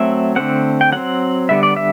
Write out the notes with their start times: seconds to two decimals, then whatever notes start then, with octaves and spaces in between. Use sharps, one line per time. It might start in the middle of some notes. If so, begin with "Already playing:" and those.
Already playing: F#3 A3 C4 E5
0.36 D3 A3 C4 F#5
0.81 G5
0.92 F#3 C4 F#5
1.49 D3 G3 B3 E5
1.63 D5
1.77 E5